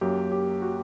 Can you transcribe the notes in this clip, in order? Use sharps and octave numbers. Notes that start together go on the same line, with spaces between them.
F#2 F#3 A#3 G4
G4
F#4